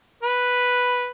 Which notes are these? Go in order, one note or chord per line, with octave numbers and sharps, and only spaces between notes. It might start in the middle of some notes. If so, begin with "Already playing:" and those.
B4